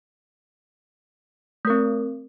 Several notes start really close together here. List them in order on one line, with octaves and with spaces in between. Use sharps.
A3 A#4 C4